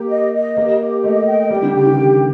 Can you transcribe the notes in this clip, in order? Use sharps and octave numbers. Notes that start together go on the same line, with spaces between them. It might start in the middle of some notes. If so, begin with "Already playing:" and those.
Already playing: A#3 G4
D#5
D#5
A#3 G4
G4
A3 D#5
G5
G3 G4
D3
C#3 G5
D#3
G4